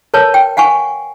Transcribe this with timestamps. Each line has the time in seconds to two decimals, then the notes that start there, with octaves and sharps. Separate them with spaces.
0.14 A#4 B4 C#5 A5
0.34 G5
0.57 F5 F#5 G#5 C#6